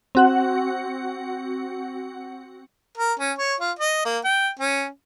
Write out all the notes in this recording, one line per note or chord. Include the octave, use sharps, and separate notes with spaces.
C4 F#4 F#5
A#4
C#4
C#5
F4
D#5
A#3
G5
C#4